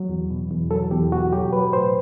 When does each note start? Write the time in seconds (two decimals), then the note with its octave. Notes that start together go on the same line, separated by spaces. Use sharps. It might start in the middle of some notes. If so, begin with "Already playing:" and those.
Already playing: F#3
0.09 E2
0.30 B2
0.51 E2
0.71 F#3 A4
0.91 E2 G4
1.12 B2 F#4
1.33 F#3 G4
1.53 F#3 B4
1.73 A2 C5